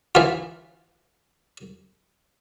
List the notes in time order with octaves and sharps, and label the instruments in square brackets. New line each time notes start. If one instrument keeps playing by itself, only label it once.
[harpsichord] E3 F4